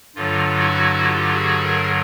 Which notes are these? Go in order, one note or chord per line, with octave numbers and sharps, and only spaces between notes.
G2 D3 F#3 F4
E4 F#4
F4 G4
F#4 G#4
G#4 A#4